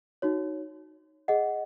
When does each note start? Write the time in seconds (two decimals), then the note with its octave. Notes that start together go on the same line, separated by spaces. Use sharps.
0.22 D#4 F#4 C#5
1.28 G#4 D#5 F#5